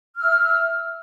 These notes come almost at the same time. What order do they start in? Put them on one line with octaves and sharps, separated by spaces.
F6 E6 E5